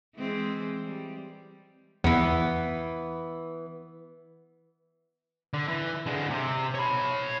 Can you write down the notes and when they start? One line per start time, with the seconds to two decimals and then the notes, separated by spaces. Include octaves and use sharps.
0.16 E3 G#3 C4
0.85 G3
2.04 E2 E3 B3
5.53 D3
5.68 E3
6.06 D3 G#3
6.30 C3
6.74 C#5 B5